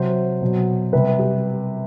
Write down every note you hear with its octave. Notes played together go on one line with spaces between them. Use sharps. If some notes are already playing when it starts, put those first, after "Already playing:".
Already playing: C3 F#3 C5
B2 F#3
C3 G3 B4
G4